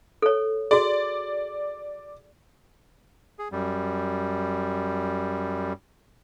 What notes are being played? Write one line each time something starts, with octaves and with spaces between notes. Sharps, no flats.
A4 C#5
F#4 G#4 D5
G#4
F#2 G3